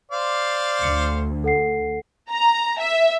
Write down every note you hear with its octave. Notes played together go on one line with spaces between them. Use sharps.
C5 D5 F5
D2 C#7
A4 F#5 C7
A#5
E5